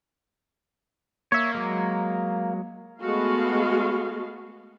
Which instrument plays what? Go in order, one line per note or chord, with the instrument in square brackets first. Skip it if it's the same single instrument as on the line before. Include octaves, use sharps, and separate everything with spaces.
[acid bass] A#3 [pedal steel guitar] C#5 E5
[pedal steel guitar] F#3 G#3
[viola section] G#3 A3 B3 F#4 F5